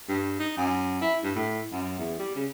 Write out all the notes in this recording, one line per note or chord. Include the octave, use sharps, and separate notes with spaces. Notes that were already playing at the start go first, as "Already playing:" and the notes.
G2
D#4
F#2
E4
G2
A2
F#2
E2
G3
C#3